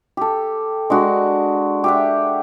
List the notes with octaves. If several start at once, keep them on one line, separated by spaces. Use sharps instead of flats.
G4 A4
G#3 D4 F#4
G4 E5 F#5